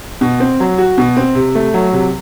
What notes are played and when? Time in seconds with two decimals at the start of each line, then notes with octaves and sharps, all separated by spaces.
0.21 B2
0.40 C4
0.60 F#3
0.78 F#4
0.98 B2
1.17 C4
1.35 C3
1.55 A3
1.74 F#3
1.93 C3